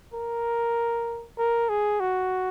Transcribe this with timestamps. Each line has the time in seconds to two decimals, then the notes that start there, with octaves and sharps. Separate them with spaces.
0.14 A#4
1.38 A#4
1.69 G#4
2.00 F#4